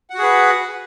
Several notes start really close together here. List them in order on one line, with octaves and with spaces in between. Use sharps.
F#5 F#4 G#4 B4